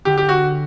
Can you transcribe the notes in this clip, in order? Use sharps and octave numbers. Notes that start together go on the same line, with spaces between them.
D3 G4
G4
F#4